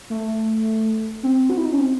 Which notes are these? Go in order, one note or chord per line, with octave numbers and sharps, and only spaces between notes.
A3
C4
F#4
E4
D#4
C#4
C4